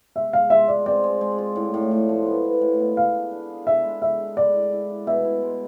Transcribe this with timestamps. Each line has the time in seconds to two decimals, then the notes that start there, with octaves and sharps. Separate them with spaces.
0.16 G#3 E5
0.33 G#3 F5
0.50 F4 E5
0.68 G#3 D5
0.86 C4 D5
1.04 G#3
1.21 G#3
1.38 F4
1.56 A2
1.74 A2
1.91 A2
2.09 F3
2.26 B3
2.44 B3
2.61 A2
2.79 B3
2.97 G#4 F5
3.14 D4
3.32 D4
3.50 G#4
3.67 G#4 E5
3.84 G#3
4.02 G#3 E5
4.20 G#4
4.37 G#3 D5
4.55 E4
4.72 E4
4.90 E4
5.07 B2 E5
5.25 E4
5.43 G#3